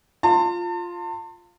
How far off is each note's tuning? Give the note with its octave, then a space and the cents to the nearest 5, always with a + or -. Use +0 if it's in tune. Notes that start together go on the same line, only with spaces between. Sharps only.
F4 +0 A5 +40